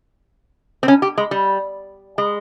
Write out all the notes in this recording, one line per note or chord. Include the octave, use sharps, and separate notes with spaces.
C4
C#4
G4
G#3
G3
G#3